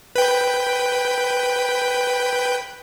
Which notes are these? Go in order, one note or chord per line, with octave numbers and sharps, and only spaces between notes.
B4 G5